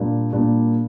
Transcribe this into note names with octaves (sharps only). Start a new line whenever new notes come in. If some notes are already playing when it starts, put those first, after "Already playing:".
Already playing: A#2 G3 A#3 D4
A#2 G3 A#3 D4